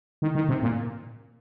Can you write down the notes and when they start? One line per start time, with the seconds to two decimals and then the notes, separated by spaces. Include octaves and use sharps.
0.22 D#3
0.35 D#3
0.49 C3
0.63 A#2